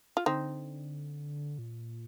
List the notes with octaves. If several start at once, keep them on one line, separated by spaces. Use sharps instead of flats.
F4
D3 C4 D#4
A#2